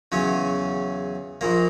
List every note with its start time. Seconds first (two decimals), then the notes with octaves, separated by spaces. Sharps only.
0.12 E2 C#3 F#3 C#4
1.41 A#1 A#2 A#3